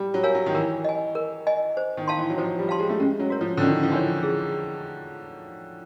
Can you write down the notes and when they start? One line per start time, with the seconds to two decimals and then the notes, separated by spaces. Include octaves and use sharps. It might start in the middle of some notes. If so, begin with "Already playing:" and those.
Already playing: G3
0.14 F#3
0.23 A#4 C#5 F5 G#5
0.35 F#3
0.46 D#3
0.55 E3 A#4
0.84 D#5 G#5
1.15 A#4
1.47 D#5 G#5
1.77 C5
1.97 D#3
2.08 F5 A5 C6
2.17 E3
2.30 F#3
2.38 F3 C5
2.59 G3
2.69 F5 A5 C6
2.79 G#3
2.89 A3
3.00 G#3 C#4
3.19 F#3
3.30 F#4 A#4 C#5
3.41 F3
3.57 D3
3.60 D#3 C#4
3.83 F3
3.92 E3 F#4 A#4 C#5
4.23 G#4